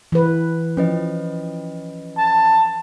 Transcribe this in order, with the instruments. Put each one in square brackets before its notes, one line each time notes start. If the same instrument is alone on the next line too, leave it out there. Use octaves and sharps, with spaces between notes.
[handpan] E3 B4
[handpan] F3 [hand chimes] C#4 B4 D#5
[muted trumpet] A5